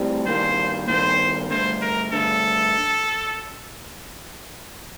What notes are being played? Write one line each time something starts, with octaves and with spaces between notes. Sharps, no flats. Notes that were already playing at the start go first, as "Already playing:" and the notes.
Already playing: A2 G3 C4
G2 D#3 A#3 C5
G2 D#3 A#3 C5
G2 D3 A3 C5
A#4
G2 D3 A3 A4